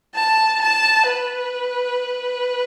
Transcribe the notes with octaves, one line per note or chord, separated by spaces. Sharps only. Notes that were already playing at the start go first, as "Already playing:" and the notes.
A5
A5
B4